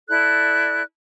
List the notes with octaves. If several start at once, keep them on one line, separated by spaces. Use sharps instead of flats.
E4 A4 D5 F#6